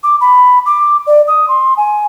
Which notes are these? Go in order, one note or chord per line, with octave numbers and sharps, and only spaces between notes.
D6
B5
D6
D5
D#6
C6
G#5